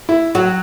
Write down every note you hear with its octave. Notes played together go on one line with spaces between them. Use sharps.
E4
F#3 F#4